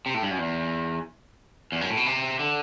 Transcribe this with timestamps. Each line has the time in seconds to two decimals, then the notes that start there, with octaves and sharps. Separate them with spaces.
0.06 C3
0.14 A2
0.22 G2
0.31 F#2
0.39 E2
1.72 E2
1.81 F#2
1.89 A2
1.97 B2
2.06 C3
2.39 D3